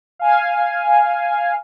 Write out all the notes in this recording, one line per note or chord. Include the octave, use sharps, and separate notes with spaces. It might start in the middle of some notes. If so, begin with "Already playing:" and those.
F5 G#5